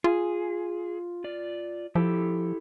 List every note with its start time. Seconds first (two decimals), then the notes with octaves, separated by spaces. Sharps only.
0.04 F4 G#4
1.24 F4 D5
1.95 F3 E4 G4 A4